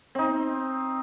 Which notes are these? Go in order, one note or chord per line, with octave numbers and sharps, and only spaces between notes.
C4 D#4